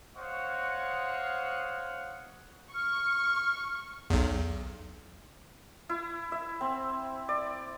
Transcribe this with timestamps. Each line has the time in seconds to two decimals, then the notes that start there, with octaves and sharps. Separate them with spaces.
0.16 C5 C#5 D#5 F5 F#5 C#6
2.73 C#6 F6
4.10 B1 E2
5.89 E4
6.32 E5
6.61 C4
7.29 D5